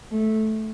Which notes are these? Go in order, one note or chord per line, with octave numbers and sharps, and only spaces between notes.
A3